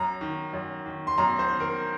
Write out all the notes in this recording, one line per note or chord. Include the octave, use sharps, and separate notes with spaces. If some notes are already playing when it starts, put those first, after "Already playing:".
Already playing: F#2 A#5
D#3
F#2
D#3
C6
F#2 A#5
C5
D#3
A#4